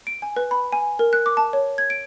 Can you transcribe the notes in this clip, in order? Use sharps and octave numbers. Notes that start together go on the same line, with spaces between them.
D7
G#5
B4
B5
G#5
A#4
F#6
D6
A5
C#5
G#6
D7